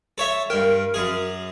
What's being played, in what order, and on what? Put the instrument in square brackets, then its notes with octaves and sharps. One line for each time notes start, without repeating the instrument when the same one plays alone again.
[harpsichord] A4 C#5 E5
[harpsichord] G2 G5 [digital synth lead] A#4
[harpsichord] F#2 G#4